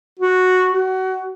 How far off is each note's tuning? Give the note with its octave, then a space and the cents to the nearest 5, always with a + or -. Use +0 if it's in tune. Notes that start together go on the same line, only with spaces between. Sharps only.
F#4 -5
F#4 +25